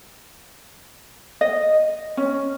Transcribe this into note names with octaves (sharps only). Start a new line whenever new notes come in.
D#5
C#4